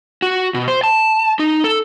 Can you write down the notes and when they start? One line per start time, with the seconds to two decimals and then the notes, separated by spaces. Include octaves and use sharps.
0.22 F#4
0.54 B2
0.68 C5
0.84 A5
1.39 D#4
1.64 A4